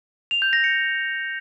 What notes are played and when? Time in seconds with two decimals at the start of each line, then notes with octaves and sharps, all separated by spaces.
0.31 F7
0.42 G6
0.53 A#6
0.64 C#7